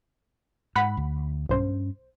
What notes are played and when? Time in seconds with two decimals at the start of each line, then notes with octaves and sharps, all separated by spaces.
0.76 G#2 F#5 B5
0.97 D2
1.49 B1 G2 C#4 C5